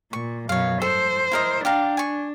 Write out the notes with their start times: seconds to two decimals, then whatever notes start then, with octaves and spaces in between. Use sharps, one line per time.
0.13 A#2 C#6
0.49 F#2 B2 C#5 F5
0.82 A4 C5
1.32 E4 A#4 D#5
1.65 D4 G4 F5 A#5
1.97 G#5 C#6